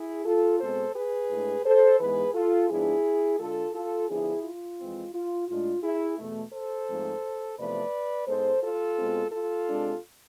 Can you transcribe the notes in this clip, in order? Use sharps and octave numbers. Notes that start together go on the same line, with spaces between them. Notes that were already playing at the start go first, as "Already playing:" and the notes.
Already playing: E4 G#4
F4 A4
B2 G#3 C4 A4 C5
G#4 B4
A2 G#3 D4
A4 C5
G#2 E3 G#3 B3 G#4 B4
F4 A4
G#2 F3 B3 D4 E4 G#4
D3 G#3 D4 F4 A4
F4 A4
D3 F3 B3 D4 E4 G#4
F4
F2 E3 G#3 C4
F4
A2 G#3 D4 F4
E4 G#4
E2 B2 A3
A4 C5
G#2 F3 A3 C4
E2 C3 F3 A3 B4 D5
G#2 G#3 B3 A4 C5
F4 A4
B2 G#3 C4
F4 A4
C3 G#3 D4